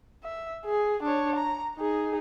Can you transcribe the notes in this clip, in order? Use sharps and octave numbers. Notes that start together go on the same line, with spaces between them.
E5
G#4
D4 C#5
A#5
D#4 G#4